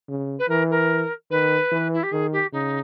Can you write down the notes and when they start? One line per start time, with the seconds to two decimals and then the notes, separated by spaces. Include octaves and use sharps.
0.08 C#3
0.39 B4
0.49 E3 A#4
0.70 A#4
1.30 D#3 B4
1.71 E3
1.93 E4
2.03 G4
2.12 D#3 G#4
2.32 G4
2.52 C#3 D#4